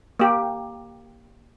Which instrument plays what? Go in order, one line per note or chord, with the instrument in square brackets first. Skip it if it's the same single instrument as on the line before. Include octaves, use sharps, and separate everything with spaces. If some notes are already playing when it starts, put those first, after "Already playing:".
[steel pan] A#3 G4